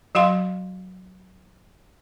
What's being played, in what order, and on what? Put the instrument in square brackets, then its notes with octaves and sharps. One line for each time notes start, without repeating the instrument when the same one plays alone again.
[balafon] F#3 F#4 F5 C6